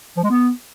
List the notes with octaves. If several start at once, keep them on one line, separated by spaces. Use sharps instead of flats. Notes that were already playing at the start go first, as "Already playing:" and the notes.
F3
G#3
B3